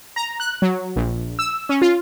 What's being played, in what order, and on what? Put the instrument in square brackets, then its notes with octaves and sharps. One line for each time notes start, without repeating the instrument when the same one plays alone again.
[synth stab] A#5
F#6
F#3
A#1
E6
C#4
F4